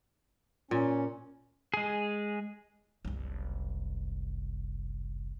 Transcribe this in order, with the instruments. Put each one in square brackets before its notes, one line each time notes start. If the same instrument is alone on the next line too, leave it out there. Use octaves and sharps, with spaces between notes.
[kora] A#2 [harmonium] C#4
[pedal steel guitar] G#3 G#4
[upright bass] F#1 C2